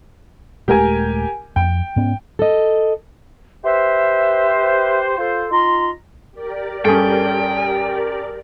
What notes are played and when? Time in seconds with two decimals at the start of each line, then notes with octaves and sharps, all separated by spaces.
0.68 D#1 G#3 A3 G4 A#4 G#5
1.56 F2 G5
1.96 G#2 B3 C#4
2.39 A4 D#5
3.64 G4 B4 C5 E5
5.18 F4 A4 C5
5.51 D#4 F4 A#5 C6
6.32 G4 A#4 D5
6.85 G2 C#4 G#4 A4 G5